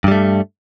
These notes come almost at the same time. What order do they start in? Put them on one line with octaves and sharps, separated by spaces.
G2 G3 A3